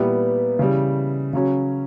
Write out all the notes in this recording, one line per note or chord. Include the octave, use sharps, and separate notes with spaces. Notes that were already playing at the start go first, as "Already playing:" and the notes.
Already playing: A#2 G3 B3 E4 G4
C#3 E3 G3
C#3 F#3 C#4